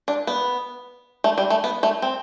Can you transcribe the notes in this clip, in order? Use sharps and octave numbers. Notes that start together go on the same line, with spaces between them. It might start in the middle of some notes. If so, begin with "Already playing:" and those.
D4
B3
A3
G3
A3
B3
A3
C4